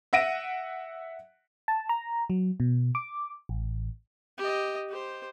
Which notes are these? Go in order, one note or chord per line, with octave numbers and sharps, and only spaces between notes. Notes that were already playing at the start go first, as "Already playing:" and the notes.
E5 F#5 A#6 D7 D#7
A5
A#5
F#3
B2
D6
A1
G4 D#5
G4 C5